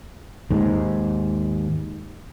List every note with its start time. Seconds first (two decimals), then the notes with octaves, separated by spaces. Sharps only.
0.51 D#2 G#2